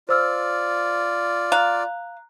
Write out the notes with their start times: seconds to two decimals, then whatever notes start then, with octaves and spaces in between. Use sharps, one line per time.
0.09 F4 C5 D5 E6 F6
1.52 F5 A#5 F#6